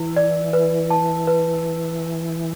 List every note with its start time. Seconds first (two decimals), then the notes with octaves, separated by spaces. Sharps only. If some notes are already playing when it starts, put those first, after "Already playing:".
Already playing: E3 E4
0.16 D5
0.53 B4
0.90 A5
1.27 B4